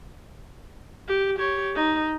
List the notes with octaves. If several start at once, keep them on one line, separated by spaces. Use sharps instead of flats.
G4
G4 C#5
D#4